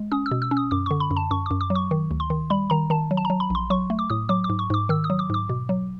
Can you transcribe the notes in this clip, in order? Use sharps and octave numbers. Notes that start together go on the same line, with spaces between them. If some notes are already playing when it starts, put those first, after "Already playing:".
Already playing: G#3
C#4 D#6
E6
B2
E6
C#4
D#6
F#2 D6
D3 C#6
B5
F#2
A5
F#2 C#6
F#2 D6
D6
F#3
C#6
D#3
D2
C6
D#3
G3 B5
D#3 A#5
D#3 A5
F#3
A5
A#5
F#3
B5
A#1 C6
F#3 C#6
A3
D6
A2 D#6
F#3 D6
D6
G#2
C#6
G#2 D6
D#3 E6
D#6
F#3
D6
G#2 D6
B2
F#3